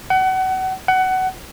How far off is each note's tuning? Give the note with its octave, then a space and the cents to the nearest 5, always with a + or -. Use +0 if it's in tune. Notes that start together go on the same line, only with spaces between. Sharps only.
F#5 +30
F#5 +20